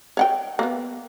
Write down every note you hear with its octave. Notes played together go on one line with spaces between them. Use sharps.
C#5 F#5 G5
A#3 B3